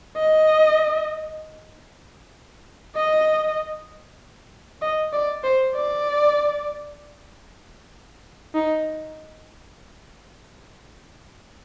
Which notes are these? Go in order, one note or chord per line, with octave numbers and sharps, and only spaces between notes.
D#5
D#5
D#5
D5
C5
D5
D#4